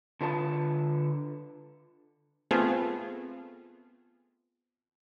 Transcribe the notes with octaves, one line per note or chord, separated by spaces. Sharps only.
D3 F4 B4 A5
A3 B3 C4 F4 G#4 A4